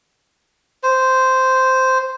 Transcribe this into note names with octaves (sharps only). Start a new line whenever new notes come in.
C5